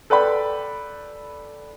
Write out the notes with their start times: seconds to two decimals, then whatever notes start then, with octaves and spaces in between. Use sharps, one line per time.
0.10 A4 B4 D5 G5 B5